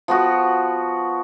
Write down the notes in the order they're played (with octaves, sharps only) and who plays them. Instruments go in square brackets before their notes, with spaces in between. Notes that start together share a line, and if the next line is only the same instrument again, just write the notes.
[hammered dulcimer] F3 B3 F#4